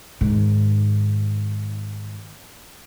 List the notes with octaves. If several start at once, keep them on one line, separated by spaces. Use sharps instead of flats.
G#2 D#3